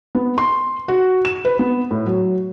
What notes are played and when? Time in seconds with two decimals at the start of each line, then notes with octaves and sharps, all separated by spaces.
0.15 B3
0.38 C6
0.88 F#4
1.25 E7
1.45 B4
1.59 B3
1.91 A2
2.06 F#3